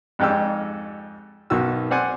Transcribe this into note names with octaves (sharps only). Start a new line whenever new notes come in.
F2 G#2 G4 D5 E6
B1 D#3 F#4 E6
C4 D5 F#5 G#5